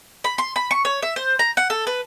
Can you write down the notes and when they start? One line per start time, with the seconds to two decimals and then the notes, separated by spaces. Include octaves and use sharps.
0.24 B5
0.38 C6
0.56 B5
0.71 C#6
0.85 C#5
1.02 E5
1.16 C5
1.39 A#5
1.57 F#5
1.70 A4
1.87 B4